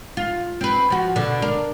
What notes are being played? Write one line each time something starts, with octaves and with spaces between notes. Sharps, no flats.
F4
C4 B4
F3 F#4
B2 D3
D4 A#4